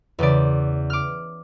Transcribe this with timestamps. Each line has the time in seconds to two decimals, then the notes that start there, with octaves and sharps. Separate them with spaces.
0.19 E2 C#3 D5
0.90 D6 F6